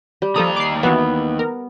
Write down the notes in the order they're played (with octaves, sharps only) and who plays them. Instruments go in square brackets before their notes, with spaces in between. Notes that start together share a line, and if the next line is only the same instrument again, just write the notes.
[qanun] G3
[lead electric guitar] D#2 A#5 [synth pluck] F3 A4 D#6
[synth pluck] D6 C7
[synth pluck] E3 F#4 [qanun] B3
[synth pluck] A#4